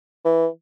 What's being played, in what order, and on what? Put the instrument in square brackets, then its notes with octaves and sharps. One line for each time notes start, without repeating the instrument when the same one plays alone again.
[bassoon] E3